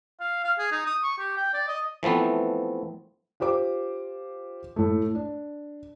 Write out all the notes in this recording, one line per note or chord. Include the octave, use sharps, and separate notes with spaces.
F5
F5
G#4
D#4
D#6
C#6
G4
G5
D5
D#5
E3 F3 A3 B3 C4
F4 G4 C5 D6
A2 A3
D4